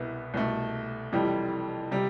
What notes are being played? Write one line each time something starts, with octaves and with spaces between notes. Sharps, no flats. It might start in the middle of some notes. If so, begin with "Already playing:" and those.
Already playing: C2 B2 B3 E4
C2 B2 A3
F1 F2 E3 G3
C3 G3